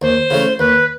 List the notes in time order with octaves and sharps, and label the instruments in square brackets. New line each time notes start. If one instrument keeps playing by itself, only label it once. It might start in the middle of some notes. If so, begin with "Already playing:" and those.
[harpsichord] D#2 [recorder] C5
[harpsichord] C#3 E3 A3 C#4
[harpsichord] D#2 [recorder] B4